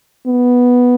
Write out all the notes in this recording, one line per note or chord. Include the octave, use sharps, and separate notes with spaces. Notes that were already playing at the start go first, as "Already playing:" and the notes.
B3